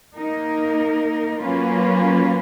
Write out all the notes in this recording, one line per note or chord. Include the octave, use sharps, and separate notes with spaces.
A#3 D#4 A#4
F#3 A#3 C#4 F4 B4